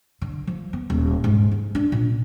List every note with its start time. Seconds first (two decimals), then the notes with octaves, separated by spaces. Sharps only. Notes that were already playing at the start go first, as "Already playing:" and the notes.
0.21 D3
0.47 F3
0.73 B3
0.90 D#1
1.24 G#2
1.51 D#4
1.75 D4
1.92 A#2